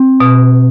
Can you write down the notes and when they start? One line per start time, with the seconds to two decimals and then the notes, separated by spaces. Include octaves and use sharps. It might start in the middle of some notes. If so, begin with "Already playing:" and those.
Already playing: C4
0.20 B2